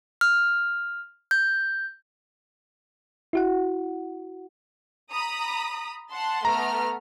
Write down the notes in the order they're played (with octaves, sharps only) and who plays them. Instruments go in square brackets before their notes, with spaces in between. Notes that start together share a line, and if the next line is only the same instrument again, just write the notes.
[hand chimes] F6
G6
[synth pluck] E4 F#4 F#5
[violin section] A#5 B5 D#6
F#5 A5 C6
[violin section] A3 B3 F6 [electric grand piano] A#5